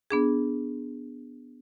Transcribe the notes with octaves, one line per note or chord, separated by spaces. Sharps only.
B3 D4 G#4